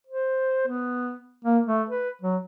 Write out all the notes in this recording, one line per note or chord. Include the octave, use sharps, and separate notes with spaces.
C5
B3
A#3
A3
B4
F#3